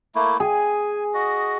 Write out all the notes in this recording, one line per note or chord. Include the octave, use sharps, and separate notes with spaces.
A3 A#3 E4
G#4 G#5
F#4 D#5